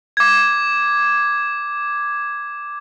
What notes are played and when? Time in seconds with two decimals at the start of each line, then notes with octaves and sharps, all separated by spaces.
0.17 D6 G#6